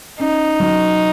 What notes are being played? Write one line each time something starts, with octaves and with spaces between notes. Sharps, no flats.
C#4 D#4
F#3